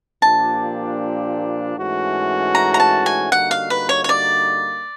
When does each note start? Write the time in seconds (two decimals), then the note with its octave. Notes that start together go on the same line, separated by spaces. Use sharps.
0.22 A#2 F3 A#3 D4 G4 A5
1.77 G#2 E3 A3 C#4 F#4
2.55 A#5
2.74 A#5
2.80 A5
3.06 G#5
3.31 D3 G3 A#3 D#4 F#4 F#5
3.51 F5
3.70 B4
3.89 C#5
4.04 C#5
4.09 D5